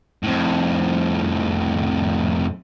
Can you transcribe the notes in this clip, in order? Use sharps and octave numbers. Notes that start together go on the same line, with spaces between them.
F2 A2